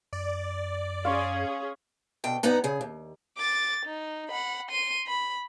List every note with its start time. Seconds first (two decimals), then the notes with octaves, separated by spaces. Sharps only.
0.13 F#2 D5
1.05 C#4 G#4 F5 C6 C#6
2.24 D2 B2 G5
2.43 G2 B3 D#4 F#5 A#5
2.64 C#3 G#4
2.81 D#2
3.38 D6 A6
3.85 D#4
4.29 F#5 B5
4.70 C6 D#7
5.07 B5